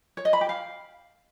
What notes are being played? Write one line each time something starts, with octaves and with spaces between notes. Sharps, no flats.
C#5
D#5
B5
G4
F5